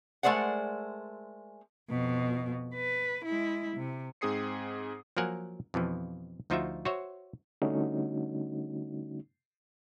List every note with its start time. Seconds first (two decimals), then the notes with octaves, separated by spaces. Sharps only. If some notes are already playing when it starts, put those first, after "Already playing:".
0.23 G#3 A3 A#4 C5 D5 F#5
1.90 F2 B2
2.74 B4
3.25 G#3 E4
3.77 C3
4.21 G#2 C4 G#4 D#6 C7 C#7
5.17 F3 F#3 A#3 A#4 F#5 G#5
5.74 F2 B2 E3 F3
6.50 D2 F3 D#4 F4 F#4 E5
6.85 F#4 C5 C#5 E5
7.62 D3 G3 A3 C#4 D#4 F#4